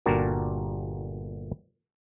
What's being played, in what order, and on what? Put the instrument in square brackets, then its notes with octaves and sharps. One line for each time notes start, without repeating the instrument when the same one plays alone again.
[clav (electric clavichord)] G1 A#2 D4 F#4 G4 A#4